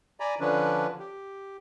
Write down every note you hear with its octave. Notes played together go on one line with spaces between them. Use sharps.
D5 G#5 A#5 B5
D3 F3 C#4 D4 B4
G4